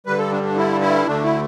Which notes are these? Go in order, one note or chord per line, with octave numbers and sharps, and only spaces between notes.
G2 D3 G3 B4
A4
D4
D4
E4
E4
D2 D3 A3 D4
E4